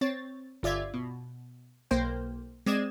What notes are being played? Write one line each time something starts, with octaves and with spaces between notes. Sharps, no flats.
C4 C#5 A6
G1 F4 D5 E5 G#6
B2
B1 A#3 C5 G5
G#3 C4 D5 D#6 G#6 E7